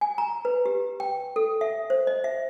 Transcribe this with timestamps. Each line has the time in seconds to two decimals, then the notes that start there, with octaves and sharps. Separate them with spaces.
0.01 G#5
0.18 A#5
0.45 B4
0.66 G4
1.00 G5
1.36 A4
1.61 E5
1.90 C5
2.07 D#5
2.24 E5